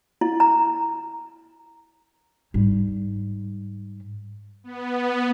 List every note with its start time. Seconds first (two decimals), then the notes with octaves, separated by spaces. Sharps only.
0.21 E4
0.40 A#5
2.54 G#2 G3
4.64 B3